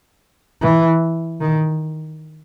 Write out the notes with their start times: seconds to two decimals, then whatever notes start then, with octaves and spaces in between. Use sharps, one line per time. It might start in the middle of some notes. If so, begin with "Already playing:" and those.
0.62 E3
1.40 D#3